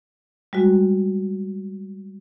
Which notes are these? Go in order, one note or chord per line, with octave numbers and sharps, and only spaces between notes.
G3 G#3 F#4